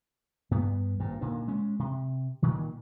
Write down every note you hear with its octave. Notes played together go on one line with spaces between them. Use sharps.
G2 B3
G#1 G2 A#2
A#2 D3 D#3
G#3 C#4
C3
A#2 D#3